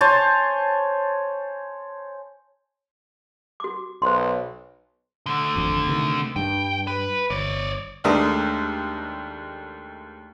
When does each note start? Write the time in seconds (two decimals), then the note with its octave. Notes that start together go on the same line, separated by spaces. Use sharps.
0.01 C5 C#5 G#5 A5
3.60 F#4 D6
4.02 B1 C5 C6
5.26 D3 A3
5.56 G#1 F2
5.87 C3 D#3
6.36 G2 G5
6.87 B4
7.30 G1 C#5 D5
8.04 D#2 G#3 A3 D4 A#4 D#6